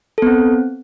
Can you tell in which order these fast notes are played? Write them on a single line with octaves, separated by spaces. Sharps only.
A4 B3 C4